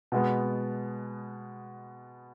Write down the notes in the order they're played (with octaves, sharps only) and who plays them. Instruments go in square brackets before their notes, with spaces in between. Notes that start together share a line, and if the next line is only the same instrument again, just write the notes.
[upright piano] B2 G#3 B3